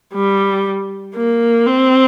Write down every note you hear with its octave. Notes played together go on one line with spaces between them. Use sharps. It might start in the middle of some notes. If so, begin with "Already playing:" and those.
G3
A#3
C4